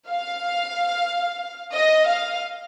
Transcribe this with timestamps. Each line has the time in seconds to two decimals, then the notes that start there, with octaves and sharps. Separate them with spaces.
0.09 F5
1.75 D#5
2.09 F5